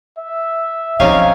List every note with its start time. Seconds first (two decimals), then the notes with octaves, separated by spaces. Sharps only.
0.18 E5
1.00 C3 F3 C#4 D#4 F5 G#5